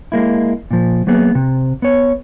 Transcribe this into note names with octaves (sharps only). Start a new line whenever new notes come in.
G#3 A#3 E4
A#2 F3
F#3 A#3 B3 G#4 B4
C3
B3 C#5